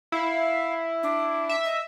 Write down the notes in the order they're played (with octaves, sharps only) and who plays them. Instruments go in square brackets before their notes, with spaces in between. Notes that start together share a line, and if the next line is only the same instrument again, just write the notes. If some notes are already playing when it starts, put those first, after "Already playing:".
[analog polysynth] E4 [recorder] F5
[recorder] D4
[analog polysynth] E5
[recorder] D#5